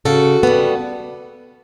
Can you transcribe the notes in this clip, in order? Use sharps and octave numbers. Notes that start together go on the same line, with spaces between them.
C#3 F#4 A4
G3 B3